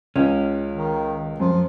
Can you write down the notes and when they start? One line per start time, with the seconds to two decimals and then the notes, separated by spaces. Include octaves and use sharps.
0.16 C#2 C#4
0.72 D#3
1.40 F#2 F3